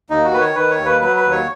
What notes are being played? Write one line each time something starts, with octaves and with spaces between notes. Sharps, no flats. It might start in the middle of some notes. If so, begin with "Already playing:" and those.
D#2 D#4
F#4
D#3 B4
C#5
D#3 B4
C#5
D#2
B4
F#3 B4
B4
D#2
C#5